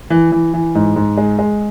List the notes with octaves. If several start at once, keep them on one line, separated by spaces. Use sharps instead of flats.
E3
E3
E3
G#2
G#2
G#3
G#3